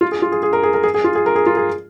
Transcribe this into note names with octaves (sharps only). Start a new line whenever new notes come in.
F4
G#4
F4
G#4
G#4
A#4
G#4
A#4
G#4
G#4
F4
G#4
A#4
G#4
F4
G#4